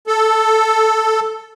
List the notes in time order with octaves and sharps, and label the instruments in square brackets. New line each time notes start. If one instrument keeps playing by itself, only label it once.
[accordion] A4